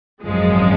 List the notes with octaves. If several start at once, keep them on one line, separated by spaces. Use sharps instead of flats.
G#1 F#2 F3 G#3